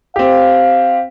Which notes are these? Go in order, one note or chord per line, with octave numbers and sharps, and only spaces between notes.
C4 G4 F5